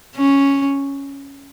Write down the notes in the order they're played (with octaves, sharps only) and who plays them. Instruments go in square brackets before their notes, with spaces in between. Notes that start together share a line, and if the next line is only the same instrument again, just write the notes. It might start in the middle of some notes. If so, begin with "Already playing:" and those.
[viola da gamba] C#4